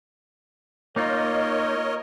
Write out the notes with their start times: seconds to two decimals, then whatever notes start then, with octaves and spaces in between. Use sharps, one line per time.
0.96 A#3 D#4 F4 A#4 C#5 D#5